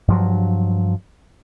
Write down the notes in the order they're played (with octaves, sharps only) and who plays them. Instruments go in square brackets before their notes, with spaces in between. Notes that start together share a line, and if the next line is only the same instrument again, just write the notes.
[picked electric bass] G2 F3 F#3